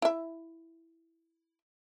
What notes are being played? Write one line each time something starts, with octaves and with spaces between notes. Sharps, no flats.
E4 E5